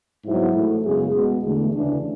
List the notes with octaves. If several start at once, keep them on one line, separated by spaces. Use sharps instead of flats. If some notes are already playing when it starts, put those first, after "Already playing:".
G#2 F#3 B3 E4
A2 E3 A3
F#2 C#3 G#3 B3 G#4
B2 G#3 B3
E2 D3 A3
D2 C#3 E3 A3 D4